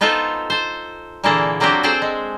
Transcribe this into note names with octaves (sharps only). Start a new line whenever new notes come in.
B3 D#4 F4 A4 B4 C5
A4 C5
A#2 D3 E3 A#3 G#4 A4
F#3 A#3 C4 D4 F#4 G4
C4 G#4 A4 C5 G5
G#3